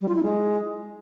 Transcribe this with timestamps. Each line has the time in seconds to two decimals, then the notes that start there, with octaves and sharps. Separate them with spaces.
0.01 G3
0.08 F4
0.15 E4
0.23 G#3